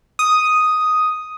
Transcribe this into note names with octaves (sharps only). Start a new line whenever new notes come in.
D#6